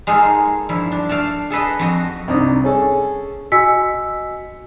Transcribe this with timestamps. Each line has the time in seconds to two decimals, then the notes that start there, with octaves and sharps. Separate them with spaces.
0.07 G#3 A#3 D#4 F4 G#4 A4
0.69 G2 F3 E4
0.92 D4
1.09 A3 A4 D5 F5
1.50 G#4 A4 B4 D#5
1.79 F2 F3 F#4 D#5
2.28 C2 D4 D#4 D#6
2.64 C#4 G#4 A4
3.52 F#4 D#5 G#5 E6 B6 C#7